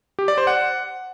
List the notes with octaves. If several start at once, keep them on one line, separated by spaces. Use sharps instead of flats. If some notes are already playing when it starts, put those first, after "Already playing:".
G4
D5
C5
F#5